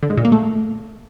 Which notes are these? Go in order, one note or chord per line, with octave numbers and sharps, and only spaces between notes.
D3
G#2
A#2
A#3
A3